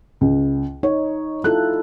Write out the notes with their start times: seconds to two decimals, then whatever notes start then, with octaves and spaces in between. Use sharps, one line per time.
0.21 C#2
0.83 D#4 C#5
1.44 E4 F4 A4 F#6